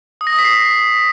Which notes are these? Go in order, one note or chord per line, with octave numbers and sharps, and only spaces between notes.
D#6
A#6
D#6
B6
C7